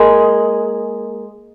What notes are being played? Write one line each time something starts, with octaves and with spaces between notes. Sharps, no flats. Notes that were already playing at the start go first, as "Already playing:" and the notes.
Already playing: G#3 A#3